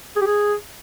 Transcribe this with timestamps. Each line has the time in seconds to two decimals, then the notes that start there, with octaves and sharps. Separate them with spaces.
0.16 G#4
0.21 G4
0.26 G#4